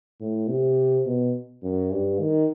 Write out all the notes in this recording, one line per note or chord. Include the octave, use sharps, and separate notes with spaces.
A2
C3
B2
F#2
G2
D#3